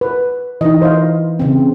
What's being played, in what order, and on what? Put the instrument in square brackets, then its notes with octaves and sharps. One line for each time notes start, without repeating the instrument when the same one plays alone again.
[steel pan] B4
[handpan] E3 [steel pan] D#4 D#5
[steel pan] C5 D#5 F5
[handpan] C#3 C4